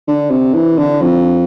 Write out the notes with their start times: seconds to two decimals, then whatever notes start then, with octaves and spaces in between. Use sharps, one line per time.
0.08 D3
0.30 C3
0.54 E3
0.78 D3
1.01 F2